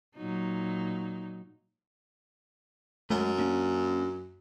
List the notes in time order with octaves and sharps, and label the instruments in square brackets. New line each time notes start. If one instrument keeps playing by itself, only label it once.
[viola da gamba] A#2 F#3 D#4
[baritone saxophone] F#2 [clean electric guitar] G#3 A3
[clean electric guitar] A#3 C#4 D4